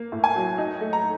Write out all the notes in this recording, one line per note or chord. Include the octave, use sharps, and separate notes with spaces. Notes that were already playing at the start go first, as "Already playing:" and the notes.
Already playing: A#3
A2
G#5
F#3
D#4
A3
A#5